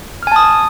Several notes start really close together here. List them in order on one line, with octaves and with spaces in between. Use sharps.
F6 G#5 A5 D#6